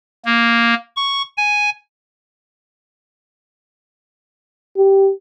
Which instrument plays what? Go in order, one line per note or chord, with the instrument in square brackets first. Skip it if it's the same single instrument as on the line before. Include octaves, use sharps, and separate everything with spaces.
[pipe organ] A#3
C#6
G#5
[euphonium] G4